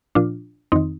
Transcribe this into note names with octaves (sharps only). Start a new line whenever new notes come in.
A#2 F3 D4 F4
F2 D#3 C4 D#4